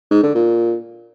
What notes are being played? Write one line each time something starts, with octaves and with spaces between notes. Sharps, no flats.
G#2
D3
A#2